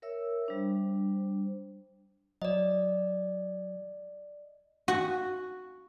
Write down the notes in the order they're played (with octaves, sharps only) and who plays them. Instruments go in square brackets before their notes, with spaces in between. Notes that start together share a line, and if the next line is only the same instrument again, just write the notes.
[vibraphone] A#4 C#5 E5 E6
G3 D4 C5
[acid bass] F#3 [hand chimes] D5 D#5
[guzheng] F#4